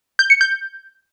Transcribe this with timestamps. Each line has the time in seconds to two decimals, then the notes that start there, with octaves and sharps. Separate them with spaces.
0.19 G6
0.30 C#7
0.41 G6